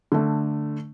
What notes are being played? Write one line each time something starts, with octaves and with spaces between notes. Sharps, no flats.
D3 A3